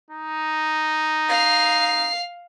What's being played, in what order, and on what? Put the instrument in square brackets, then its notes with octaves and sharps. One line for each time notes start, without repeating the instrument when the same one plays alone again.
[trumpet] D#4
[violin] F5 C7